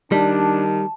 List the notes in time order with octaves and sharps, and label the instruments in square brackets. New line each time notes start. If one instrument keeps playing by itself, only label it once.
[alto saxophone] D#3 [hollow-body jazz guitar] G3 [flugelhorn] D4 [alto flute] A5